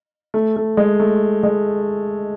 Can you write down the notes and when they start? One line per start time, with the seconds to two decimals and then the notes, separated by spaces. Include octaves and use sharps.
0.34 A3
0.56 A3
0.77 G#3
1.00 A3
1.43 G#3